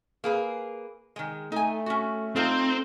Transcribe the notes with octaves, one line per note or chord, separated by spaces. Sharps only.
A#3 G#4 B4
D#3 G#3
A3 D#4 G#5
C#4 F#4
C4 D#4 F4 A4